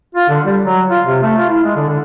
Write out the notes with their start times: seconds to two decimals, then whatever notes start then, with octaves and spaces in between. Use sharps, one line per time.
0.15 F4
0.29 D3
0.45 G3
0.65 F#3
0.90 F4
1.06 C3
1.22 A3
1.38 F4
1.49 E4
1.64 G#3
1.76 D3
1.89 D3